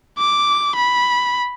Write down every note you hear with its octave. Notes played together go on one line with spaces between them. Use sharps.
D6
B5